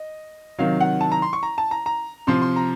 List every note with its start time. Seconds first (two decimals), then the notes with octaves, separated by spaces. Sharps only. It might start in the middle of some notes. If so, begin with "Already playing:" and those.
Already playing: D#5
0.58 C3 D#3 F#3 F5
0.80 F#5
1.01 A5
1.12 A#5
1.22 C6
1.33 C#6
1.43 A#5
1.58 A5
1.71 A#5
1.86 A#5
2.27 C3 F3 C6
2.42 C6
2.56 A#5